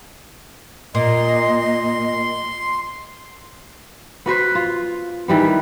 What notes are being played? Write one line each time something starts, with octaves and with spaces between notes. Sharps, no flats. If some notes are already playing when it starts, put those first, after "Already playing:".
A#2 D#5 C6
B3 F#4 B4 C5
F4
D#3 E3 G3 B3